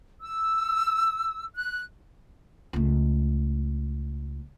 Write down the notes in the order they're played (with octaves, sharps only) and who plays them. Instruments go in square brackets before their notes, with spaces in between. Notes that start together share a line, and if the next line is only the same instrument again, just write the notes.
[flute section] E6
F#6
[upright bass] C#2 A3